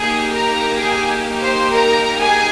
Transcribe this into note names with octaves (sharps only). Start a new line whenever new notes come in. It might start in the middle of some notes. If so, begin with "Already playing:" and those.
Already playing: A#3 D#4 G4 G#4 G#5
A#4 A#5
G#4 G#5
C5 C6
A#4 A#5
G#4 G#5